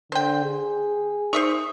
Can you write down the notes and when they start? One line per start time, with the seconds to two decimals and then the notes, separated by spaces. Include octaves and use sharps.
0.12 D3 C5 G5
0.44 G#4
1.33 D#4 C5 E5 C#6